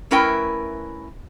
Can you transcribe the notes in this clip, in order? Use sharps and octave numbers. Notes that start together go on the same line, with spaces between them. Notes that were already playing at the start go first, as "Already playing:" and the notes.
A3 C#4 E4 A#4 B4 G5